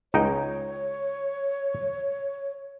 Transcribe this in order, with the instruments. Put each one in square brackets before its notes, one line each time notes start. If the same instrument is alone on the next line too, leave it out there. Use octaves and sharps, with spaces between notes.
[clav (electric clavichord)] C#2 D#4 G5 [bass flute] C#5